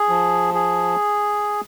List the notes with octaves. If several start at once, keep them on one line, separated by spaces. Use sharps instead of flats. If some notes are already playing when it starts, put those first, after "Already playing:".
Already playing: G#4
F3
G#4